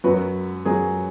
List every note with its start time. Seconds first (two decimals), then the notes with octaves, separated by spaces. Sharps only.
0.04 F#2 F#3 F#4 B4
0.65 F#2 F#3 G#4